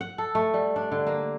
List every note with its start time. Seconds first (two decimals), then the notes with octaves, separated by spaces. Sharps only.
0.01 F#5
0.18 A4
0.35 A3
0.54 G3
0.76 D4
0.92 D3
1.07 A#3